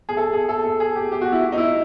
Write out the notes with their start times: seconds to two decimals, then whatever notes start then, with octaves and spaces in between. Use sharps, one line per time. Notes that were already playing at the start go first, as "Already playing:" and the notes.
0.09 G#4
0.17 A4
0.33 G#4
0.49 A4
0.64 A4
0.80 G#4
0.96 G4
1.12 G4
1.22 F#4
1.32 E4
1.52 D#4
1.58 E4